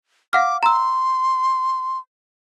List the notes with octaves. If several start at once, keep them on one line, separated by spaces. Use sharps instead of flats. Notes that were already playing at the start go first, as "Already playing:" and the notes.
F5 F#5 D6 F6
A#5 C6 E6